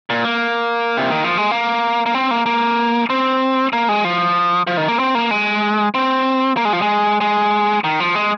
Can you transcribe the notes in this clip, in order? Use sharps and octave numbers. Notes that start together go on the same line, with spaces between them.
A#2
A#3
C3
D#3
F3
G#3
A#3
A#3
C4
A#3
A#3
C4
A#3
G#3
F3
F3
D#3
A#3
C4
A#3
G#3
C4
A#3
G#3
F3
G#3
G#3
D#3
F3
G#3